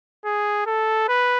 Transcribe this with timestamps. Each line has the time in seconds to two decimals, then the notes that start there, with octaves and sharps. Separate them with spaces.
0.25 G#4
0.66 A4
1.08 B4